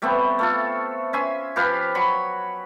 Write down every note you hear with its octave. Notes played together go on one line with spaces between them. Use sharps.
G3 A3 B3 C4
A3 F4 A4
C#4 E5 G#5 C6
F3 G4 B4 F5
F#3 B5 C#6